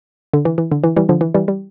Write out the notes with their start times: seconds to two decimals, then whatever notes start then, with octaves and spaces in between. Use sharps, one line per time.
0.33 D3
0.45 E3
0.58 E3
0.72 D3
0.84 E3
0.97 E3 G3
1.09 D3 F3
1.21 E3
1.34 E3 G3
1.48 G3